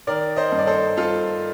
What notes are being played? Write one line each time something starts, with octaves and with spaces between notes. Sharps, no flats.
D#3 A#4 D5
C5 D#5
G2
D5
A4 C5
G2 F4 A4